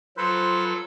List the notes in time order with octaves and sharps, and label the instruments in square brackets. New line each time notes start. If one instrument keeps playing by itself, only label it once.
[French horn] F3 [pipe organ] F#3 A4 [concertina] B4 C5